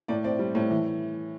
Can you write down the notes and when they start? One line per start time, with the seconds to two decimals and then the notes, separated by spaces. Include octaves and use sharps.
0.08 A2 D5
0.24 C4 D5
0.39 G3
0.55 A2
0.70 E3